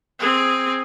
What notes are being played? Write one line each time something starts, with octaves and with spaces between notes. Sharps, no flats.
C4 G#4